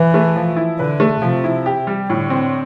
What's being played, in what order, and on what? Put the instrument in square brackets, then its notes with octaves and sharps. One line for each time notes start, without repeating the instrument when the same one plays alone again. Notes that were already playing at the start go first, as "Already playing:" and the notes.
Already playing: [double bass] E3 [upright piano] B4
[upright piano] A3
F3
E4
[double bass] D3 [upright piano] B4
[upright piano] A3
[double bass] C3 [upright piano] F3
[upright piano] E4
G4
G3
[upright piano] A2 [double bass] D3
[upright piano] C4